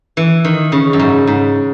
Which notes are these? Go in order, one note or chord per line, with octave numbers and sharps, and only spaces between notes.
E3
D#3
C#3
F#2
G#2
G#2